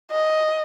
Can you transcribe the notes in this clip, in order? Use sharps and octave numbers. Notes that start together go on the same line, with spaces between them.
D#5